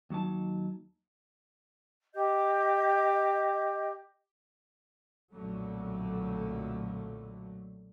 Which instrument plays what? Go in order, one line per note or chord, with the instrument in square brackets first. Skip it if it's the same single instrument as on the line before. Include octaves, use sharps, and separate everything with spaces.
[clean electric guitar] D#2 F#3 D#4 A5
[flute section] G4 D#5 G6
[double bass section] B1 F2 A#2 D3 F#3 A3